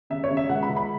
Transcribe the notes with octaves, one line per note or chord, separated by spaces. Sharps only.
C#3 E5
C#5
C#3
E5
C#2 F#5
B5
C#2
B5